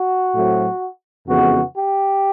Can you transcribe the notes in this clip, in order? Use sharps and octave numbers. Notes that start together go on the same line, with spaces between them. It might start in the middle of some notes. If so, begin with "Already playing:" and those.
Already playing: F#4
A2 F#3 A3 C4
F2 C#3 E3 G#3 B3 F#4
G4